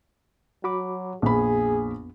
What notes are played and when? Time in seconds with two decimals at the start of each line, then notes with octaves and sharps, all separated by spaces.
0.64 F#3 F#4 B5 D6
1.22 A#1 F2 B3 G#4 B5